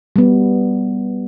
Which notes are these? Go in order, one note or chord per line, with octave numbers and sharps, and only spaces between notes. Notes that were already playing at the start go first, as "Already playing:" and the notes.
G3 B3